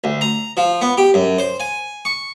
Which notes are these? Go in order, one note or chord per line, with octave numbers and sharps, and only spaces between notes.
D2
A#5
F3
B3
G4
F#2
C5
G#5
C#6